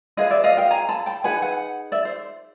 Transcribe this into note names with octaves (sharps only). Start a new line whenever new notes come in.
E4 G#4 B4 D#5 F5
D5 E5
D#5 F5
F5 G5
G#5 A#5
A5 B5
G5 A5
D#4 G#4 B4 F#5 G#5
F#5 G#5
D5 E5
C5